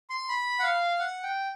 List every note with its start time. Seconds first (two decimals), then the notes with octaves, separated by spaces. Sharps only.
0.10 C6
0.29 B5
0.60 F#5
0.63 F5
0.99 F#5
1.23 G5